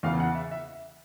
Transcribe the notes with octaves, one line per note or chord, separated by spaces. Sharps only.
E2 C#3 E3 F5
F#5
E5
E5